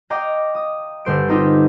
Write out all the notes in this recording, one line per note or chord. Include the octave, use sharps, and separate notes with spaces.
D#5 F5 G5 A#5 D6
D#6
G1 C5 D7
C4 D#4 F4 G4